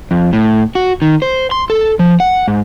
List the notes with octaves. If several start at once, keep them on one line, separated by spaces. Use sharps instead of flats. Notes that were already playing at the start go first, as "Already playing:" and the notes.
F2
A2
F#4
D#3
C5
C6
A4
F3
F#5
G#2